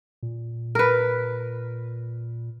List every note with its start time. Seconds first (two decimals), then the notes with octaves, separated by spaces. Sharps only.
0.23 A#2
0.75 A#4 B4